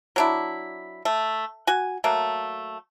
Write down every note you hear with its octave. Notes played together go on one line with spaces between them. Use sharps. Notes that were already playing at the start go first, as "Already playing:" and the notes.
F#3 D4 E4
A3
F#4 G#5
F#3 A3 A#3